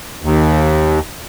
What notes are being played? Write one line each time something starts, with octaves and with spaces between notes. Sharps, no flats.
D#2